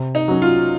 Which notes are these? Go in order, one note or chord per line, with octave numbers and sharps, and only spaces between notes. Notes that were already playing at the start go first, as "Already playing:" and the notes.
Already playing: C3
D#4
F#3 C#4
F4